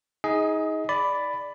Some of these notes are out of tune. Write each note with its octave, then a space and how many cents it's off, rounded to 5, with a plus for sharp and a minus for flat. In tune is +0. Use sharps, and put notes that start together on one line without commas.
D#4 +25 G#4 +0 D#5 +25
D5 -5 B5 +10